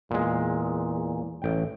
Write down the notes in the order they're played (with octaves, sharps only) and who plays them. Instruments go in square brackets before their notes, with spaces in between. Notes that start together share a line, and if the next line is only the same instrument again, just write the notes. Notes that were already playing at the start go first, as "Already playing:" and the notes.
[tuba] E2 [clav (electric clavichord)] A#2 G#3
[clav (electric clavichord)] A1 G5